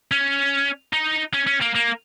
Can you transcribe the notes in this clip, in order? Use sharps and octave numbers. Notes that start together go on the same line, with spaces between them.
C#4
D#4
C#4
C#4
A#3
A#3